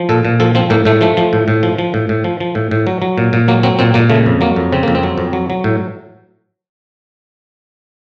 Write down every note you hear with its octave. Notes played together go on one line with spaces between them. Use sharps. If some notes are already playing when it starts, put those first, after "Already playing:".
Already playing: F3
A#2 A4
A#2
F3 A4
F3 C4
A2 A#3
A2 A3
F3 A3
F3
A2
A2
F3
F3
A2
A2
F3
F3
A2
A2
F#3
F#3
A#2
A#2
F#3 A#3
F#3 C4
A#2 C4
A#2 A#3
C#3 A3
F2
F#3 A#3
F2
C#3 C4
F2 A#3
C4
F#3
F2
F#3
F#3
A2